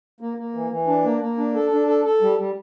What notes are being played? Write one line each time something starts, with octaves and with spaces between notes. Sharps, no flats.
A#3
A#3
E3
E3
D4
A#3
A#3
D4
A4
D4
A4
A4
G3
G3